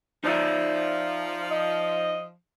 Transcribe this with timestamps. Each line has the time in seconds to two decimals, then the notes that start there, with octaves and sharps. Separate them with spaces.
0.24 F3 D#4 D5 E5
1.51 D#5